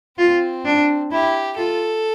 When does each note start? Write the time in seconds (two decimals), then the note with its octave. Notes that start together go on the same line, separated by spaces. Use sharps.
0.18 C4 F4
0.65 D4
1.12 E4 G4
1.57 F4 A4